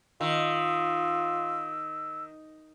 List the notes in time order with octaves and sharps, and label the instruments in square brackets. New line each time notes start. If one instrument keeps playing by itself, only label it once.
[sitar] D#3 [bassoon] F4 [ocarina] E6